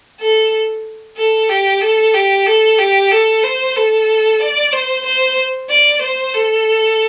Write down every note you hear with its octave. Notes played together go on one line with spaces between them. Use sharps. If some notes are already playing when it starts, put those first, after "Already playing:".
A4
A4
G4
A4
G4
A4
G4
A4
C5
A4
D5
C5
C5
D5
C5
A4